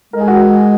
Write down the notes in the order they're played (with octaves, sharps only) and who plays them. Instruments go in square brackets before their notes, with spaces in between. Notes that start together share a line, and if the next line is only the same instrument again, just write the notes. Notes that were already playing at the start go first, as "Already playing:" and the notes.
[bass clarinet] G#3 [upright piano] A#4
[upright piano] G#4
F#4